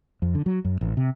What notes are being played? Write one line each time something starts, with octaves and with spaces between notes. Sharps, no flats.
F2
D3
F#3
F#2
A1
C3